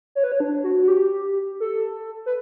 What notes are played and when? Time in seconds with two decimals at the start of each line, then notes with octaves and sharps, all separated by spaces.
0.15 C#5
0.24 B4
0.32 C#5
0.40 D4
0.64 F#4
0.83 F#4
0.88 G4
1.60 A4
2.26 B4